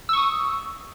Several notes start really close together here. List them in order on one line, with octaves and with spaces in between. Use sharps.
E6 C#6 D#6